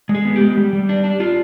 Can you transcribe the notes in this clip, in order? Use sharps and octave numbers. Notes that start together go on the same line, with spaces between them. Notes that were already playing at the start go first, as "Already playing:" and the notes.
G#3
G#4
B3
G4
G#3
G3
G3
D4
D4
D4 F4